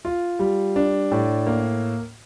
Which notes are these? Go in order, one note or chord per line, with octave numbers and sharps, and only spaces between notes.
F4
G3
D4
A2
A#3